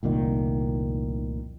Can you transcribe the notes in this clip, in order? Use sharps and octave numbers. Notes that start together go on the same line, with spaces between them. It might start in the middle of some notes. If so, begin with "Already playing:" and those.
F1 C2 A#2 D#3